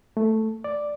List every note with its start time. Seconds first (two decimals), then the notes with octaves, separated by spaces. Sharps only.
0.17 A3
0.64 D5